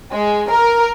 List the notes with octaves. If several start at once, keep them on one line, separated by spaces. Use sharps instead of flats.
G#3
A#4